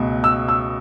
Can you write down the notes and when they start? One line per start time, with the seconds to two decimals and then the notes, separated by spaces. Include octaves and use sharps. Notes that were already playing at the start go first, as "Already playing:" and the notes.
Already playing: C#2 B2 A3
0.24 E6
0.48 E6